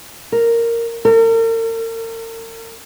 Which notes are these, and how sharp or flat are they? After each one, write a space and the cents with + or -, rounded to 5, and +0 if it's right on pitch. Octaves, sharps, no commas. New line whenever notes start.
A#4 -5
A#4 -45